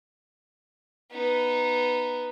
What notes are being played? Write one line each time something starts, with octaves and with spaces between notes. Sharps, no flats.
B3 D#4